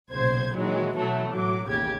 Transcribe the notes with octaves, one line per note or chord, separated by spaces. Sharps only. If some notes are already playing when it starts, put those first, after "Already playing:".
B1 A#2 C#3 C5 G#6
A#2 D#3 E3 F#3 G#3
B2 E3 F#3 A3 B3
A2 F#3 D6
A1 D#2 C#3 G4 G#6